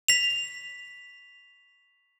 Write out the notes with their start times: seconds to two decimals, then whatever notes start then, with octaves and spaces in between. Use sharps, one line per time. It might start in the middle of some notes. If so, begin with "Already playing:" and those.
0.08 B6 F7